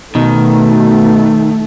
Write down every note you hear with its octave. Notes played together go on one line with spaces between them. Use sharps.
B2 D#3 A3